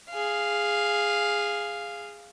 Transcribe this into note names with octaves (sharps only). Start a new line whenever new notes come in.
G#4 F5